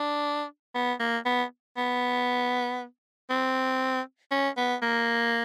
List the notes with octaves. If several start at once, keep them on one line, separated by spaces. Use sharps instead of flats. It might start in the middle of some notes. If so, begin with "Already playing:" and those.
Already playing: D4
B3
A#3
B3
B3
C4
C#4
B3
A#3